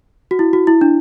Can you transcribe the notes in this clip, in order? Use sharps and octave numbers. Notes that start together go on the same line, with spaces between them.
F#4
E4
F#4
E4
D4